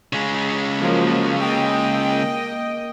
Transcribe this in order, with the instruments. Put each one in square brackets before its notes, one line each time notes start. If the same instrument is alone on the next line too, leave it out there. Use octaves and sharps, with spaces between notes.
[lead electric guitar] C#3 G#3
[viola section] F3 F#3 A#3
A#3 D#5 G5